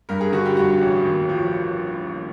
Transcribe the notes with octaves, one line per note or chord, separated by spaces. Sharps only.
G2 A#4
G#4
D3 F#4
G4
G2 F#4
A1
D#2
F3